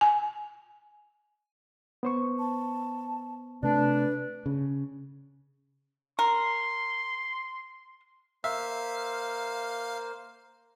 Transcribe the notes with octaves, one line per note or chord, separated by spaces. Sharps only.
G#5
B3 C5 C#6
A5
C3 A3 D4 B4
C#3
A#4 C6
A#3 C5 E5 F5